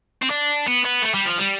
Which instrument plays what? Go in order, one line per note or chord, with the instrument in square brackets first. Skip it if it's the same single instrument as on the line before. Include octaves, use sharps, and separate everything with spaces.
[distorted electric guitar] C4
D4
B3
B3
A3
G3
F3
G3